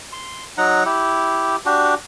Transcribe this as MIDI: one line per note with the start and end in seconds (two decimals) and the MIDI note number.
0.12 0.44 84
0.58 0.83 54
0.58 0.83 63
0.58 0.83 78
0.58 0.83 82
0.86 1.56 64
0.86 1.56 67
1.66 1.95 62
1.66 1.95 66
1.66 1.95 67